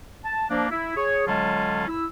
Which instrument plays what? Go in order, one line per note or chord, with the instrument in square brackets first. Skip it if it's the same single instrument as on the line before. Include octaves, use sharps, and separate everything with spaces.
[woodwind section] A5
F3 A#3 D4
E4
G#4 C#5
D3 F#3 G#3 C#4 F4 A5
E4 E6